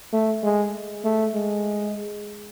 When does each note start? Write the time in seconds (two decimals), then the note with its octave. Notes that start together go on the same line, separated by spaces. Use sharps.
0.13 A3
0.43 G#3
1.04 A3
1.34 G#3